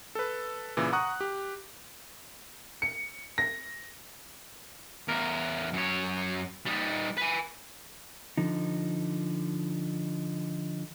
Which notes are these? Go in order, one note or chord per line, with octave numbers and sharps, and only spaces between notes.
A4 B4
A#2 C#3 E3
F#5 A#5 C#6 D#6 F#6
G4
C#7
A#6
E2 A#4
F#2 C#5
G3 D#4
B4 G#5
D3 F3 D#4